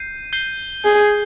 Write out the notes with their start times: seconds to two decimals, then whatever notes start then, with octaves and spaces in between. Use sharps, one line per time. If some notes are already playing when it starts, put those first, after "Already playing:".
Already playing: G6 C7 D#7
0.33 G6 C7 G7
0.84 G#4